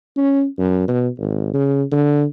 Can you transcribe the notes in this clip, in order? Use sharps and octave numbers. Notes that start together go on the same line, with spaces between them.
C#4
F#2
B2
G#1
C#3
D3